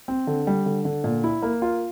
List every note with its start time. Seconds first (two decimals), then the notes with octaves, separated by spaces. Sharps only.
0.08 C4
0.27 D3
0.47 G3
0.66 D3
0.85 D3
1.04 A#2
1.24 E4
1.42 A#3
1.62 F4